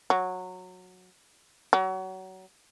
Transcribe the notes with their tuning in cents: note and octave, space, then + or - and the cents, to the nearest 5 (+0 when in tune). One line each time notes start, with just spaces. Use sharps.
F#3 -15
F#3 +25